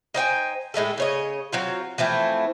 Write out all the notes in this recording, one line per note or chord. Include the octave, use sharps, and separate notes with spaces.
D#4 C5 G5 G#5
A2 G#3 A3 A4
C#3 C#5 D#5
F#3 C4 F4
E3 F3 A3 C4